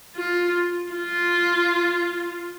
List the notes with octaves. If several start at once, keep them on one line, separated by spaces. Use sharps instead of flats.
F4
F4